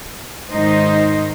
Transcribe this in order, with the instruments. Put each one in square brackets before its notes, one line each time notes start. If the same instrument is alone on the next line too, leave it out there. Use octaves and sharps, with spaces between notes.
[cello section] G#2 D#3 D#4 C5 D#5